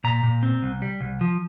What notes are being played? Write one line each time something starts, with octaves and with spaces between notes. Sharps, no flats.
A#2 A#5
A#2
C4
C2
G3
C2
F3